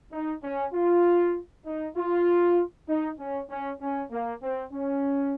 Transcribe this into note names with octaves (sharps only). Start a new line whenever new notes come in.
D#4
C#4
F4
D#4
F4
D#4
C#4
C#4
C#4
A#3
C4
C#4